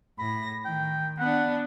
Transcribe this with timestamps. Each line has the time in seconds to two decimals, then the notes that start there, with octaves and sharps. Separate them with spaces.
0.18 A2 B5 A#6
0.65 D#3 G5
1.18 B3 D4 F#5